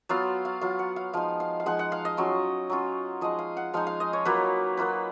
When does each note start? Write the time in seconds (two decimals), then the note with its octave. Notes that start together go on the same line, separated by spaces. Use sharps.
0.09 F#3 B3 F4 F5
0.45 F5
0.61 F#3 B3 F4 F5
0.79 F#5
0.96 F5
1.13 F3 G#3 D#4 F5
1.40 F5
1.60 F5
1.66 F3 G#3 D#4 F#5
1.79 F#5
1.92 F5
2.05 D#5
2.17 F#3 C#4 F4
2.70 F#3 C#4 F4
3.21 F3 G#3 D#4 D#5
3.39 F5
3.57 F#5
3.73 F3 G#3 D#4 F5
3.87 F5
4.00 D#5
4.13 C#5
4.25 F#3 A#3 F4 B4
4.77 F#3 A#3 F4 B4